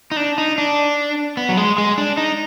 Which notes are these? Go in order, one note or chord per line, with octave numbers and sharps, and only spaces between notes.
D#4
D4
D#4
D4
B3
F#3
G#3
G#3
D4
D#4